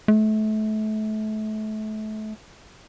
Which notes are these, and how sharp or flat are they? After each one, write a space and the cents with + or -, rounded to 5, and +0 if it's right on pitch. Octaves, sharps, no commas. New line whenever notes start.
A3 -30